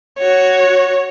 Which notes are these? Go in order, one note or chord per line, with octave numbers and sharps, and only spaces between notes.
F#4 C#5